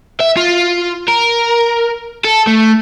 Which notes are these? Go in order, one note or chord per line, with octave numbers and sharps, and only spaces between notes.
E5
F4
A#4
A4
A3